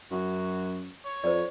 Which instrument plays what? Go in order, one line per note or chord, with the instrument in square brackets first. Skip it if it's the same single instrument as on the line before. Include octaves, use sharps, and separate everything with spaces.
[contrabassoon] F#2 [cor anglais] F#4
[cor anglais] C#5
[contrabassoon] F2 [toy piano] C5 D5